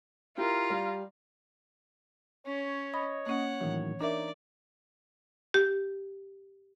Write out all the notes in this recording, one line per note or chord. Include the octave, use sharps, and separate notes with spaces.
E4 F4 G4 A#4 A#5
G3 F5
C#4 C#5
D#5 B5
A#3 C#4 F#5
A2 D#3 E3 F#3
D4 D#4 A#4 D5 E5
G4